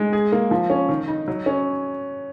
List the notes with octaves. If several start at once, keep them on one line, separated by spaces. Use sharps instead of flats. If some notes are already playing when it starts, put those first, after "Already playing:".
Already playing: G#3
G#4
A#3
F3
C#4
D#3
D#4
F#3
C#4